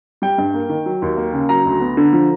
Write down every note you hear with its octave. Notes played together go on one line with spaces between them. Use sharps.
G3 G5
G2
A#3
D#3
F#3
D#2
A#3
C#3
F#3 A#5
D2
B3
D3
F3